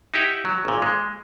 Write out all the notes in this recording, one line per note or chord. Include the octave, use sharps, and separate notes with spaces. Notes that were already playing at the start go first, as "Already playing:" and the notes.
D#4 E4 G4 E5 F#5
F#3
G#1 A#2
G#3